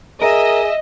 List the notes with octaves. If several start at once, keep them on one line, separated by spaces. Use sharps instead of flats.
G#4 A#4 D#5 E5